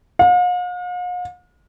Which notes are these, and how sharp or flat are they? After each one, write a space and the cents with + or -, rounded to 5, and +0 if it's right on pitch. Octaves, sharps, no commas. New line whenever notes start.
F5 +45